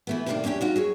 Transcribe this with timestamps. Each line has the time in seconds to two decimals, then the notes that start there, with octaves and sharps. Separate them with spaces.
0.07 E3 A3 B3
0.26 A2 C3 D#3 A3 A#3 D4
0.44 E2 C#4 D4 G4 G5
0.61 D#4 F4 F#4
0.76 F#3 G#4 C#5